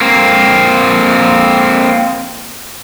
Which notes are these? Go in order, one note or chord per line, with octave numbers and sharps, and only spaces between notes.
A#3 C4